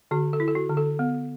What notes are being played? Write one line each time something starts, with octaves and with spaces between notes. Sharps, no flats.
D3 F#4
A4
E4
A4
F#4
D3
A4
B3